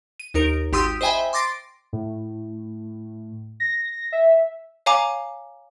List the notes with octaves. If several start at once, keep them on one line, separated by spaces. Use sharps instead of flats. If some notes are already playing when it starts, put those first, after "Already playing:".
D#7
D#2 D#4 A#4 D7
G#1 G4 C6 D#6 E6 D#7
C5 D#5 E5 G5 G#5 B5
C6 D6 A6 A#6 C7 D7
A2
A#6
E5
C#5 F5 G#5 A#5 D6